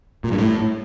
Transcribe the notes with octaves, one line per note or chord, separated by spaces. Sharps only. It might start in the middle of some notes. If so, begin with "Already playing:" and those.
A#2
G2
A2